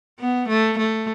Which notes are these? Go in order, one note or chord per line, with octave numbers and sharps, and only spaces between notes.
B3
A3
A3